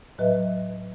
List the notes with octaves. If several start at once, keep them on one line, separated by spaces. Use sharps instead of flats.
A2 F#3 B4 D#5 E5